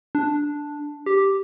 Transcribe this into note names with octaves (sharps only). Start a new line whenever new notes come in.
D4
G4